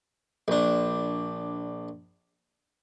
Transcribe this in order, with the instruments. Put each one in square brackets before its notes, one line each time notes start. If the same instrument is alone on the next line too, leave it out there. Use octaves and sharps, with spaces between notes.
[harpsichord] A#1 D4